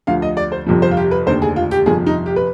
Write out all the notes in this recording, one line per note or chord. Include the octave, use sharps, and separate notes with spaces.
D2 D3 F3 F5
D#5
D5
C5
G1 F2 C3 F3
C5
F4
G4
B4
F1 D#2 D3 C5
G#4
F4
G4
G1 F2 C3 F3 G#4
D#4
G4
B4